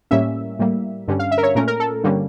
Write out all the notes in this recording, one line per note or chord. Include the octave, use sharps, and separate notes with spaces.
A2 G3 A#3 C#4 E5
A2 G3 A#3
G2 D3 G3 C#4
F5
E5
A#4
C#5
A#2 A3 C#4 A#4
A#4
A4
G2 D3 G3 A#3 C#4